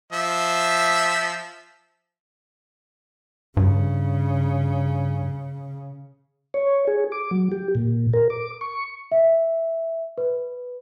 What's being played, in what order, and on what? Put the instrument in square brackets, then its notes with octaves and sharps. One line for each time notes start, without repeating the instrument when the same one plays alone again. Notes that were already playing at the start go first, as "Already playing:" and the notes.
[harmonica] F3 E5
[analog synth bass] G2 [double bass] C#3
[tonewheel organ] C#5
G#4
D6
F#3
G4
A#2
A#4
D6
C#6
[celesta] E5
B4